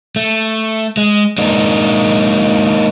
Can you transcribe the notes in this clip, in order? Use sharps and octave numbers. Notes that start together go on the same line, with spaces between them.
A3
G#3
G#3 A#3 D4 D#4